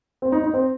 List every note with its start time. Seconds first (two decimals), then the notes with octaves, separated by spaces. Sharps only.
0.22 C4
0.32 D#4
0.43 D#4
0.54 C4